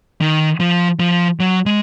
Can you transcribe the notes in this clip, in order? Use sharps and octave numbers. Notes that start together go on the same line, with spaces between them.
D#3
F3
F3
F#3
G#3